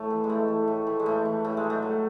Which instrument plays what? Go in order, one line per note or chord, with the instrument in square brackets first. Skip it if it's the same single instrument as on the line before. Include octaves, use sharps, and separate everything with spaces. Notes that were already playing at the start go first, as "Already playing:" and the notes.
Already playing: [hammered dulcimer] A2 A3
E3
G#3
A2 A3
E3
A2
E3
G#3
A2 A3
E3
A2 A3
G#3
F#3
A3
A2